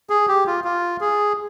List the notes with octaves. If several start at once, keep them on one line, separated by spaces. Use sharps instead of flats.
G#4
G4
F4
F4
G#4